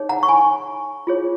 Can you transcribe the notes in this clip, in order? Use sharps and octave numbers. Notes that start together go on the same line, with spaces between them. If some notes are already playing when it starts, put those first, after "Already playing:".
Already playing: D#4 G#4 C#5
F#5 A#5
C#6
G#5 B5
F4 G#4 C#5